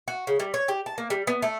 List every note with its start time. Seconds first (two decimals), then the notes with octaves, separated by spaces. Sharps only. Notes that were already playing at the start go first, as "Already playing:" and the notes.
0.08 F#4
0.27 C#3
0.40 G3
0.54 C#5
0.68 G4
0.86 A5
0.98 A#3
1.10 G3
1.27 B3
1.42 A3